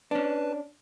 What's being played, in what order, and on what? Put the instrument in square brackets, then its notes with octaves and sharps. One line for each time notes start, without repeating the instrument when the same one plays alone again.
[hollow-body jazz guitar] C#4 D4 [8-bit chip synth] B4 A5